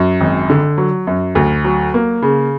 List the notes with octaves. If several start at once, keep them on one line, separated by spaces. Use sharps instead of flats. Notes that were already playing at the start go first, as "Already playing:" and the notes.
Already playing: F#2
G#1
D3
F#3
F#2
D2
F#3
A#3
C#3